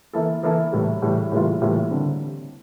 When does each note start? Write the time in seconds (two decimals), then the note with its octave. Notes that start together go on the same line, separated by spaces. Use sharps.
0.13 E3 A#3 E4 A4
0.43 E3 A#3 E4 A4
0.72 A2 E3 G3
1.02 A2 E3 G3
1.32 A2 E3 G3 A#3 F4
1.61 A2 E3 G3 A#3 F4
1.91 D3 G3 C4